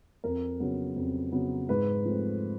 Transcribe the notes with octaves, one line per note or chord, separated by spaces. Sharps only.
F2 A#4
C#3 F#3 B3
F2
C#3 F#3 B3
G#2 B4
F3 A3 C4